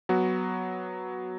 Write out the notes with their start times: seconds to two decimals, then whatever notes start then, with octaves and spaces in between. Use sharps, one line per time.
0.09 F#3 B3 F#4